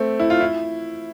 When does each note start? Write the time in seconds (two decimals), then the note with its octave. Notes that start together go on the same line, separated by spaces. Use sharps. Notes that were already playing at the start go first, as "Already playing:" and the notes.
Already playing: A3 C4
0.20 E4
0.30 F4
0.40 E4